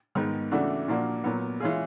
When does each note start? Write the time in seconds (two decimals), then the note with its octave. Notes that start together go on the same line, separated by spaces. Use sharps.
0.15 G#2 D#3 G#3 B3 D#4
0.51 C#3 E3 A3 D4 F#4
0.88 A#2 F3 A#3 D4 F#4
1.24 A#2 F#3 B3
1.60 E3 G#3 C#4 F4 G#4